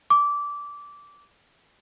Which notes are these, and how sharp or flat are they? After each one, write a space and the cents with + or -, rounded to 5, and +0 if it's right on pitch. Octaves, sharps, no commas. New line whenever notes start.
D6 -15